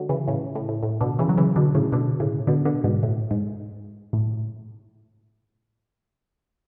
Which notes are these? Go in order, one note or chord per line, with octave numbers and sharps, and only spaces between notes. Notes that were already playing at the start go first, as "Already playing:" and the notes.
Already playing: D3 F#3 G#3
C#3 E3
A2 C#3
A2
A2
A2
B2 D3
C#3 E3
F#3
C#3 E3
B2 D3
A2 C#3
B2 D3
A2 C#3
B2 D3
B2 D3
G#2 B2
A2
G#2
A2